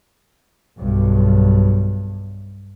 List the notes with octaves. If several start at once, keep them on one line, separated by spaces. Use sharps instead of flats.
B1 G2